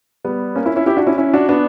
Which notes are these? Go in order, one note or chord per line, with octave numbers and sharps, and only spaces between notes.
G3 B3
A#3 C#4
C#4 E4
C#4 E4
E4 G4
D4 F#4
C#4 E4
C#4 E4
D4 F#4
B3 D4